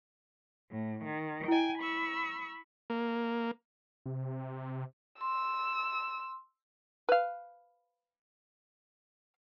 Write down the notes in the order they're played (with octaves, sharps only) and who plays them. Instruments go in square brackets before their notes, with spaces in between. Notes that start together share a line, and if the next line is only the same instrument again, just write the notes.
[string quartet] A2
D#3
[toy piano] E4 D#5 [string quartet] G5 G#5
[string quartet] B5 C#6 E6
[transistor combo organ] A#3
[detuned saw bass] C3
[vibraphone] C6 [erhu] E6
[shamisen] B4 F5